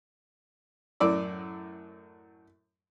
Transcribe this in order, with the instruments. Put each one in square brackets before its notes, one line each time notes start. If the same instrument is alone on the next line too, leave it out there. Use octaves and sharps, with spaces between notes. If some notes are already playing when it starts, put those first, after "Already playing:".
[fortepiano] F#2 A2 D5 E6